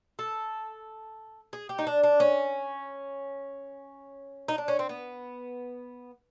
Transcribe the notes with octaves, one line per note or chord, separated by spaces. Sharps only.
A4
G#4
G4
D#4
D4
D4
C#4
D#4
D4
C#4
C4
B3